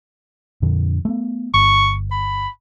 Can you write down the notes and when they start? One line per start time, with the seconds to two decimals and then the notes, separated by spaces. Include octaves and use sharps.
0.62 F2 A#2 D3
1.05 A3 B3
1.54 G1 C#6
2.11 B5